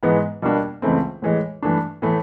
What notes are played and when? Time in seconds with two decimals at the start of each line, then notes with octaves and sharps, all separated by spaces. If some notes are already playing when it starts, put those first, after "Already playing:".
0.03 G#2 E3 G#3 B3
0.42 B2 G3 A#3 D4
0.82 C#2 C#3 E3 A3 C4
1.22 A2 E3 G#3
1.63 G2 E3 A3 D4
2.02 A2 E3 A3